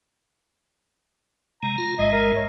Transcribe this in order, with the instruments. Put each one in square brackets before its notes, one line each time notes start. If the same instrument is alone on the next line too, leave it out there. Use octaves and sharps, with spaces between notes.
[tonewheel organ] C3 G#3 [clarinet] A#5
[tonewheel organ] F4
[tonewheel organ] A1 G#2 G#3 [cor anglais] D#5 [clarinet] E5
[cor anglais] A#4
[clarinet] C#5